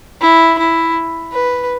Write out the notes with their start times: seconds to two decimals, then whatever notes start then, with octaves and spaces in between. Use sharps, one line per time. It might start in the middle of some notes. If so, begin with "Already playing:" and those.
0.22 E4
0.59 E4
1.33 B4